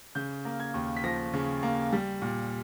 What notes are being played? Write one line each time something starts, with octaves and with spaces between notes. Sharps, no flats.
C#3 G6
A#3
G#6
D#2
B6
F3 A#6
C#3
A#3
G3
A#2